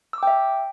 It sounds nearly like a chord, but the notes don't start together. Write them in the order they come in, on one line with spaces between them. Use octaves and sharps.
E6 D6 G5 E5